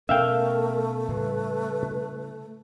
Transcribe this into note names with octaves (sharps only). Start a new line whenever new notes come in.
B2 A3 C#4 A#4 E5 F5 G5
A2 C#3 G3 B4